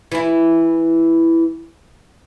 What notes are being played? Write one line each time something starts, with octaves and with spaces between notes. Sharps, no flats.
E3 E4